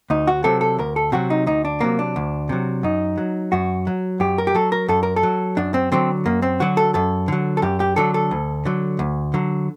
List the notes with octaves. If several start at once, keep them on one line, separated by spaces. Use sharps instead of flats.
D2 D#4
F#4
C3 F#3 A4
A4
D2 A#4
A4
C3 F#3 F#4
D#4
D2 D#4
D4
C3 F#3 A#3
D4
D2
C3 F#3
F#2 D#4
F#3
F#2 F#4
F#3
F#2 G4
A#4
G4
F#3 A4
A#4
F#2 A4
A#4
A4
F#3
F#2 D4
C4
D3 F#3 C4
F#2 A#3
C4
D3 F#3 F#4
A4
F#2 A4
D3 F#3
A4
F#2 G4
G4
D3 F#3 A4
A4
D2
D3 F#3
D2
D3 F#3